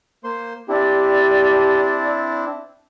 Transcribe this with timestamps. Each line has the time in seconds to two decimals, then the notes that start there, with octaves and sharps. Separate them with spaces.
0.24 A#3 C5 C6
0.69 C4 D4 E4 G4 D5